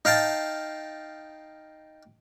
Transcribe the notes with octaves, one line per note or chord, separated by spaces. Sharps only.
D#4 F5 G5 A5